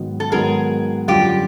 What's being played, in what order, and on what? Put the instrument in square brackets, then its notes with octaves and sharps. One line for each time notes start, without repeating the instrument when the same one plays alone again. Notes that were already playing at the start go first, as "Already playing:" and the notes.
Already playing: [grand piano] G#2 D#3 F#3 B3
[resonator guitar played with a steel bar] A4
[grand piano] G#2 D#3 F#3 B3 [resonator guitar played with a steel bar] G#4 A#4
[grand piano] F#2 D3 G3 [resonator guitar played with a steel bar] F4 G4